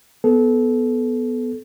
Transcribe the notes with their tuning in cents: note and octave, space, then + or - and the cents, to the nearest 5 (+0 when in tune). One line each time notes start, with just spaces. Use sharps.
B3 +0 A4 -25